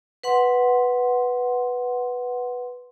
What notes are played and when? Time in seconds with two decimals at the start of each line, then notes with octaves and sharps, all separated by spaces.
0.23 B4 F#5 C6